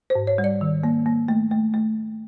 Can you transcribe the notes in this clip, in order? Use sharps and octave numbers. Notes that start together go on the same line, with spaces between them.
C5
G#2
C#5
G3
D5
D#3
A#3
A#3
A3
A3
A3